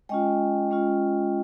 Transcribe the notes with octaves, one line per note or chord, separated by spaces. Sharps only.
G#3 C#4 F4 D#5 G5
G#3 C#4 F4